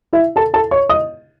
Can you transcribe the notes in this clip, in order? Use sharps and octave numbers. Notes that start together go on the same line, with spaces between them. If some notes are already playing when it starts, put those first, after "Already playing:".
E4 E5
A4 A5
A4 A5
C#5 C#6
D#5 D#6